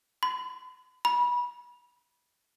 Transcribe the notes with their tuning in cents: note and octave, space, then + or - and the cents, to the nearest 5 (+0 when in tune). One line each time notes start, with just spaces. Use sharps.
B5 +45
B5 -25